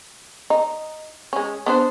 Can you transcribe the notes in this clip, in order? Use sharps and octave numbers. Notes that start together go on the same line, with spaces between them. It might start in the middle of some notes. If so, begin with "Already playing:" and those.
D#4
G#3 C#4
B3 D4 C5